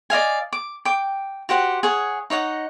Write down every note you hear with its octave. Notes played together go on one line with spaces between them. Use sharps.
D5 D#5 F5 G#5
D6
G5 D6
F#4 G4 C5 F#5
G#4 C#5 F#5
D#4 C#5 D#5 F#5